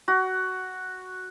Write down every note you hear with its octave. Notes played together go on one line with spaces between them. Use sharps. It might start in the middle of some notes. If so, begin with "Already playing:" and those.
F#4